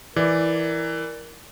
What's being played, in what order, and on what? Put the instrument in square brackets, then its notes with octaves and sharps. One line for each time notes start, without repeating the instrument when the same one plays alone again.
[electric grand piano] E3 [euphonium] A#4 [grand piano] D5